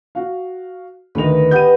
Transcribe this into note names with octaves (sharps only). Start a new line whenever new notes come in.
F#4 F5
D2 D#3 B4 D#5 F7
B3 G4 G6 D#7